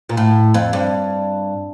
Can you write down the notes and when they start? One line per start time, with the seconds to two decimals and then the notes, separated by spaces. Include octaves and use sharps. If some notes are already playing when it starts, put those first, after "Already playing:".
0.09 A#2
0.17 A2
0.54 F2
0.73 G2